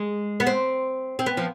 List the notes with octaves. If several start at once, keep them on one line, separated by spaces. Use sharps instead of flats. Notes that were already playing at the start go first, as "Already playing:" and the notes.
Already playing: G#3
B3
C4
C4
B3
F3